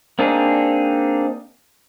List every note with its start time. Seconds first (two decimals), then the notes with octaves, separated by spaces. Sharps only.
0.19 A#3 C4 D4 D#4 G#4